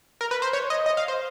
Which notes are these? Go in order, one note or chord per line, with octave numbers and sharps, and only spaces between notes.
A#4
B4
C5
C#5
D#5
D#5
F5
C5